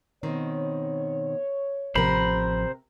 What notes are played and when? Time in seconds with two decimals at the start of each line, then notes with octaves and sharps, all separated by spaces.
0.23 B2 D#3 C4 C#5
1.95 A1 C3 F3 A#4 C5 B5